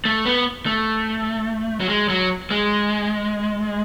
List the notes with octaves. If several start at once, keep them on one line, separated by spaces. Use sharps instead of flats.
A3
B3
A3
F#3
G#3
F#3
G#3